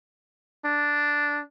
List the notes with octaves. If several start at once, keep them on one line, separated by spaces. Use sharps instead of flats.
D4